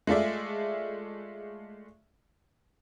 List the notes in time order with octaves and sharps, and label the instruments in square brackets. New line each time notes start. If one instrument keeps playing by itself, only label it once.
[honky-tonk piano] G#3 A3 F4 D5 E5